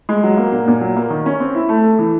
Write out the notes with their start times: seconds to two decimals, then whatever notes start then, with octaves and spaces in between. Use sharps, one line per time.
0.09 G#3
0.23 F#3
0.37 A#3
0.52 A#2
0.67 A#2
0.81 F#3
0.96 A#3
1.10 D#3
1.26 C#4
1.40 C4
1.55 E4
1.69 A3
1.84 A4
1.99 E3